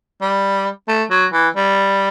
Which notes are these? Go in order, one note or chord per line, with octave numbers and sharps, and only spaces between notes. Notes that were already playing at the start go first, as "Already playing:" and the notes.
G3
A3
F#3
E3
G3